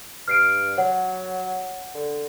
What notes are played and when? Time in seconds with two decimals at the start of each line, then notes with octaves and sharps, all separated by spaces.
0.28 G2 F6 C7 D7
0.78 F#3 C#5 F#5
1.95 D3